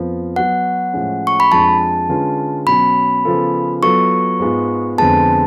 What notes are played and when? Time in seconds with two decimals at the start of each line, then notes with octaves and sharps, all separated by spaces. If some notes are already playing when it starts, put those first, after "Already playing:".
Already playing: F2 F3 B3 F4
0.36 F#3 B3 F#4 B4 F#5
0.94 A2 F3 G#3 C#4
1.27 C#6
1.40 B5
1.51 F2 F3 G#3 D4 G#4 A5
2.09 D3 G#3 C#4 F4 B4
2.67 B2 F#3 C#4 B5
3.25 C#3 F3 B3 F4 A4
3.83 F#3 B3 F4 A4 C#6
4.40 G#2 G#3 B3 F4
4.98 F2 D3 G#3 B3 A5